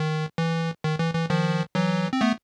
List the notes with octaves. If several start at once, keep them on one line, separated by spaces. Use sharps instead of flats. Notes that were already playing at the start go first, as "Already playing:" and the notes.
Already playing: D#3
E3
D#3
E3
E3
D#3 F3
E3 F#3
C4
A3 B3